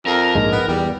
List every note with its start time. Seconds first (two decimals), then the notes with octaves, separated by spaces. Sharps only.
0.06 F2 A#4
0.35 A#1 G#2 G#3
0.52 B3
0.68 E2 G3